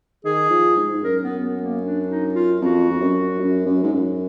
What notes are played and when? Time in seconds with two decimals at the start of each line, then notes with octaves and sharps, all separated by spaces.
0.24 D#3 G#4
0.50 F3
0.76 G#2
0.93 G#2
1.03 F#2 A#4
1.23 B3
1.42 B3
1.63 A#3
1.83 D4
2.08 D#4
2.34 F4
2.61 F2 F#4
2.91 F2
3.00 F#2
3.40 F#2
3.66 F#2
3.83 G#2
3.93 F#2